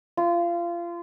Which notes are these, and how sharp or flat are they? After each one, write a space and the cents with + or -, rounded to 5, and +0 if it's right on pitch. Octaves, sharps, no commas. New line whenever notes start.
F4 -25